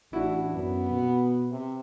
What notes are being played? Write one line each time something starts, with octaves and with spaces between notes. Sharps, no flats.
A1 D4 E4 F#4
F#2 B3
B2
C3